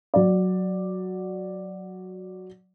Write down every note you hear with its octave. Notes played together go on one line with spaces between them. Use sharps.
F#3 D5